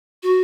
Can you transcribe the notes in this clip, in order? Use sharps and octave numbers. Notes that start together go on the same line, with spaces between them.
F#4